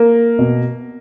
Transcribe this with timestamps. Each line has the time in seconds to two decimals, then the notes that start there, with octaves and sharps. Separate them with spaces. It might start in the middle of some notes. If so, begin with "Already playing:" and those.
Already playing: A#3
0.39 B2